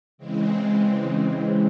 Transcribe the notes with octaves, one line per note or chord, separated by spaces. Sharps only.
C#3 E3 G#3 C4